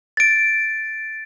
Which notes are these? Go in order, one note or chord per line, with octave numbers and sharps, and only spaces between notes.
A6 D7